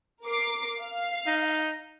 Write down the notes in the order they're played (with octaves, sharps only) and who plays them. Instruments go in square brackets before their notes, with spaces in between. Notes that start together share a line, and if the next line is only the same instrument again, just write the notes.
[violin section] A#4 D6 C7
F5
[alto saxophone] D#4